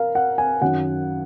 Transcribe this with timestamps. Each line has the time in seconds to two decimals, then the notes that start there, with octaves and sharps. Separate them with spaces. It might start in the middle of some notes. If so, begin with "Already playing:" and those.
Already playing: A#4 F5
0.15 F#5
0.38 G#5
0.61 F#2 D#3 F#5